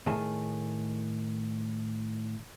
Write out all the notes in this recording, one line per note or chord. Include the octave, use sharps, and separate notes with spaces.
A2 D#3 A3 G#4 A5